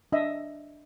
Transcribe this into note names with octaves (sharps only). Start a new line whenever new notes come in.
D4 D#5 E5